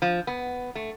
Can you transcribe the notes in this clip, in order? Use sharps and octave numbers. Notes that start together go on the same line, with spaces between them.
F3
B3
A3